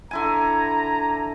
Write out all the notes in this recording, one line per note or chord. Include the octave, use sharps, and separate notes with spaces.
D3 E4 G#5 A#5